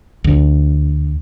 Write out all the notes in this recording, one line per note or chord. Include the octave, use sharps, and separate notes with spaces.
D2